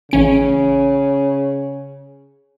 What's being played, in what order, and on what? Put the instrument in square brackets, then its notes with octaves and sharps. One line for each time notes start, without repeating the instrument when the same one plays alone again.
[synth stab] A1 C#4 D7 [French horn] C#3